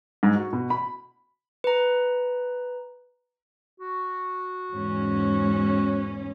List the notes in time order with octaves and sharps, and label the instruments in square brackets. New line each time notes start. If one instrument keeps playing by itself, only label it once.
[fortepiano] G#2
F#4
B2
B5
[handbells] B4 A#5
[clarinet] F#4
[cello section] E2 G#2 C#4